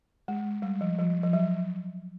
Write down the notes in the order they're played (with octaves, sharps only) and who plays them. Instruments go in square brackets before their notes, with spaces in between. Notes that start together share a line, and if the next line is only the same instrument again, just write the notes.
[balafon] G#3
G3
F3
F3
F3
F#3